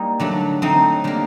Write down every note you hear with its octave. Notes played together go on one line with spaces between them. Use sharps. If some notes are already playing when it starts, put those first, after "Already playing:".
Already playing: G3 A#3 D#4
D3 F#3 A3
F#3 A3 C4 D#4
D3 G3 A#3